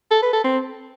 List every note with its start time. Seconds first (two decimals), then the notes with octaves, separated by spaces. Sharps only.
0.11 A4
0.22 B4
0.33 A4
0.44 C4